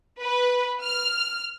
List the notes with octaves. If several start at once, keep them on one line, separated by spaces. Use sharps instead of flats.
B4
F6